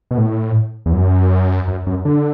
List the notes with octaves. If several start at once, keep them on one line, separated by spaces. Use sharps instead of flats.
B2
A2
E2
F#2
F#2
F#2
D3